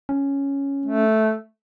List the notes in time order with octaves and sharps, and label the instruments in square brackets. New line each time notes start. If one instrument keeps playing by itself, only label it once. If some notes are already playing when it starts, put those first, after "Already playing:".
[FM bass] C#4
[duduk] A3